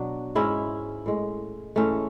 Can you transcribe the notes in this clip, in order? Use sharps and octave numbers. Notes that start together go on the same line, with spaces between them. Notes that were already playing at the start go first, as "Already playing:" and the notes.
Already playing: B2 F#3 D4 F#4
G#2 G#3 C#4 E4
A2 G#3
A2 E3 G#3 A3 C#4